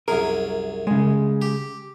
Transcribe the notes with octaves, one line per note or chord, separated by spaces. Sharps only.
C2 F#2 G#4 A#4
C#3 G#3
G4